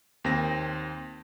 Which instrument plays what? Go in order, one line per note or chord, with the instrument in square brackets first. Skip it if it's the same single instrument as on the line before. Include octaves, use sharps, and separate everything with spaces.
[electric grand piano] D#2 C4 A#6